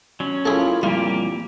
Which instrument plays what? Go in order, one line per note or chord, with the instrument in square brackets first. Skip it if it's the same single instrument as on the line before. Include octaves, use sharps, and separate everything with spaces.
[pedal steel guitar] F#3 C#4
[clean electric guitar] A#3 E4 F4 [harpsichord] G#4 A4
[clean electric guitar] F2 A#2 E3 [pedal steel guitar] G3 A#3 G4 [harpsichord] F4